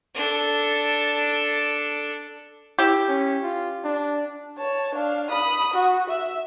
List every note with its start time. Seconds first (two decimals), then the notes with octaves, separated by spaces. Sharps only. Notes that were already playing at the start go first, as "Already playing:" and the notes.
0.15 D4 A4
2.79 E4 G4
3.08 C#4
3.43 F4
3.85 D4
4.58 C#5 A5
4.95 D4 F5
5.30 B5 D#6
5.74 F#4
6.09 E5